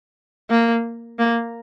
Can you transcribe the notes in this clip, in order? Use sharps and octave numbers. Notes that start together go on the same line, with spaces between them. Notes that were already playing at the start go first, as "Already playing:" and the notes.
A#3
A#3